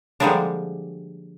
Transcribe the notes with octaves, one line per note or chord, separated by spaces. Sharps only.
D3 F3 G3 G#3 A#3 D4